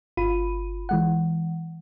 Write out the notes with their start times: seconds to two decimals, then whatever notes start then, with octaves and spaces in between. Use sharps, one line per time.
0.17 G1 F4 B5 D#7
0.89 E3 G#3 F#5